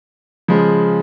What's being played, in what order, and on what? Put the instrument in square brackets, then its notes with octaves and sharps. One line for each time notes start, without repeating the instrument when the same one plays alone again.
[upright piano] C#3 F3 G#3